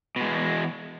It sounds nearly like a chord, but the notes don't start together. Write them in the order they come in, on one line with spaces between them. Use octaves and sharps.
B2 G#3 E2